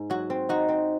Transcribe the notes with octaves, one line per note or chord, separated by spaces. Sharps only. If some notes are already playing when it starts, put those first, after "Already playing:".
Already playing: G#2
F#3 F#4
C4
D#4 F#4
C4